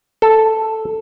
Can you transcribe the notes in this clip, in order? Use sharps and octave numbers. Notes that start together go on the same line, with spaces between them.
A4